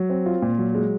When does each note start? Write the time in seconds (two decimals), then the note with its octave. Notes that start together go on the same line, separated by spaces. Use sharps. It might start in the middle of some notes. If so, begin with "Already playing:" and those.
Already playing: F#3
0.10 C4
0.26 F4
0.42 A#2
0.58 F#3
0.75 G#3